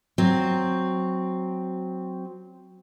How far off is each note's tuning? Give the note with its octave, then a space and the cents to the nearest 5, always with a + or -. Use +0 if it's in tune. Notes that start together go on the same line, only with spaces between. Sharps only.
F#3 +0 C4 +0